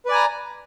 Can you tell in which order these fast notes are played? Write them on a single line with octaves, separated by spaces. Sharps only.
B4 D5 G#5 A#5